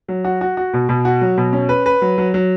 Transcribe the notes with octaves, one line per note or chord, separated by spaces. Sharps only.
F#3
F#4
F#4
F#4
B2
B2
F#4
F#3
B2
C#4
B4
B4
F#3
F#3
F#3